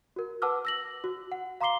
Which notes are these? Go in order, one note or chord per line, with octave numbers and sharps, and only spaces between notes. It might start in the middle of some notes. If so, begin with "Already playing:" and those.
F#4 A#4
B4 F#5 A5 D6 E6 F6
E6 A#6 F#7
F#4
F#5
F5 A#5 C6 D6 C7 G7